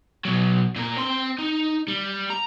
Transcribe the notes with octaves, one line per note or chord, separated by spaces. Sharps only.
B2 F#3
A#2 A#4
C4 C6
D#4
G3
A#5